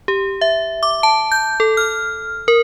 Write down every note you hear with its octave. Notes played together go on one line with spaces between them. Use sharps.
G4
E5
D6
A5
G6
A4
F6
A#4